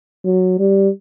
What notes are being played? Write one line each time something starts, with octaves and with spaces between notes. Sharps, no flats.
F#3
G3